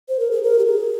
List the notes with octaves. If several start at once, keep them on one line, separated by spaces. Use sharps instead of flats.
C5
A#4
G#4
A#4
G4
G#4